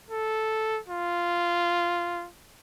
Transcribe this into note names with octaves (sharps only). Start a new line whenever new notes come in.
A4
F4